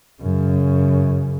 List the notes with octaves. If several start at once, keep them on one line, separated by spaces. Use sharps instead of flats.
F#2 C#3